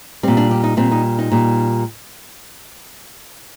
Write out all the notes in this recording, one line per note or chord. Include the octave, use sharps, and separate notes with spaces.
A#2 G3 C4
D4
G4
D#4
A#2 G3 C4
D#4
D#4
A#2 G3